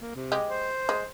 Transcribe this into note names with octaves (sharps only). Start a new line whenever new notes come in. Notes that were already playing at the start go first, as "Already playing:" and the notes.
A#3
C3
G#3 G4 D#5
C5
G#3